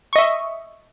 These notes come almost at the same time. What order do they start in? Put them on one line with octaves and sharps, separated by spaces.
C#6 D#5 E5